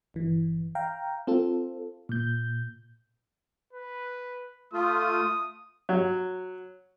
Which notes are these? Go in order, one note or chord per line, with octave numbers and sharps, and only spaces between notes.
G1 E3
F5 G5 A#5
C4 F4 A4
A#2 G6
B4
A3 F4 D#6
F#3